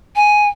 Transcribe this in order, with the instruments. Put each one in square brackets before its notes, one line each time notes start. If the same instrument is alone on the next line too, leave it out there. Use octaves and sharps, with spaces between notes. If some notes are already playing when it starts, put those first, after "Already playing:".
[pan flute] G#5